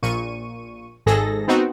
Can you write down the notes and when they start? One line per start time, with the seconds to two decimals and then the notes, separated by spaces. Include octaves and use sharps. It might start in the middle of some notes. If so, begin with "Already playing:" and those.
0.03 A#1 A#2 C#6 D#7
1.06 G#1 G#2 G#4 A4 A#6
1.48 B3 C4 D#4 F#4